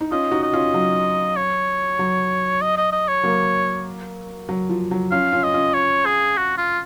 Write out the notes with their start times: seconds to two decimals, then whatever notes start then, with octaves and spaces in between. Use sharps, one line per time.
0.01 D#4
0.11 C#4 F4 D#5
0.31 D#4 F#4
0.43 D#5
0.53 C#4 F4
0.74 F#3
1.37 C#5
1.99 F#3
2.62 D#5
2.77 D#5
2.92 D#5
3.08 C#5
3.23 F#3 A#3
4.49 F#3
4.69 F3
4.91 F#3
5.12 C#4 F4 F5
5.32 C#4 F4
5.43 D#5
5.53 C#4 F4
5.74 C#5
6.06 G#4
6.37 F#4
6.58 F4